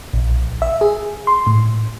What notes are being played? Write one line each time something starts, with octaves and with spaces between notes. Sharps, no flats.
A#1
E5
G#4
C6
A2